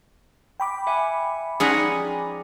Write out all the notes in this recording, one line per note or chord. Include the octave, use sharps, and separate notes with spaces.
G5 B5 D6
E5 F#5 G#5
F3 C#4 D#4 G#4 D5 F#5 G#5 C6